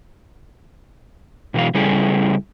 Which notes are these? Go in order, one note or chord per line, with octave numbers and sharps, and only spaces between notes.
B2 E3 F#3 F5
C#3 G3 C#4 E4 G#4 A4